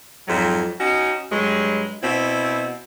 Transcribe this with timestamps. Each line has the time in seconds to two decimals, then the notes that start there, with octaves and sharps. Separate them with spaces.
0.28 F2 G#2 F#3
0.80 C#4 D#4 F#4
1.31 G2 F#3 G#3
2.03 B2 C4 E4